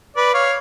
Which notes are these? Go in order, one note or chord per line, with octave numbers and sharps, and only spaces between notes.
B4 D5
C#5 F5